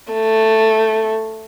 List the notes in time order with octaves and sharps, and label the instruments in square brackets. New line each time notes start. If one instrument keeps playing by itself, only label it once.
[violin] A3